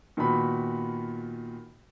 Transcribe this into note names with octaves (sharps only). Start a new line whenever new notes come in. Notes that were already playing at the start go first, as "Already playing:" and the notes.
A#2 D#3 B3 F#4 B5